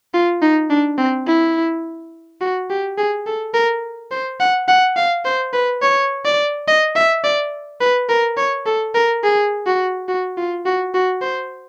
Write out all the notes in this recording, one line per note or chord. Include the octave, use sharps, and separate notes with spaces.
F4
D#4
D4
C4
E4
F#4
G4
G#4
A4
A#4
C5
F#5
F#5
F5
C5
B4
C#5
D5
D#5
E5
D5
B4
A#4
C#5
A4
A#4
G#4
F#4
F#4
F4
F#4
F#4
C5